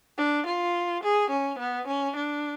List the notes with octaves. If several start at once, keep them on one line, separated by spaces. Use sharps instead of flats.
D4
F4
G#4
C#4
B3
C#4
D4